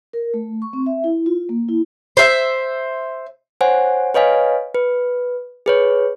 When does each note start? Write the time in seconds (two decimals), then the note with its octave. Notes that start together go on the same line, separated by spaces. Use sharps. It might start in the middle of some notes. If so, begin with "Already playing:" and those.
0.13 A#4
0.34 A3
0.62 C#6
0.73 C4
0.86 E5
1.04 E4
1.26 F4
1.49 A#3
1.69 E4
2.17 C5 E5
3.61 C5 C#5 F#5 G#5
4.14 B4 C#5 D#5 F5 G#5
4.75 B4
5.66 G#4 B4 C#5